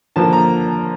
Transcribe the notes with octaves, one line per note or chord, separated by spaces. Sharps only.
D3 F3 A#3 A5
A#5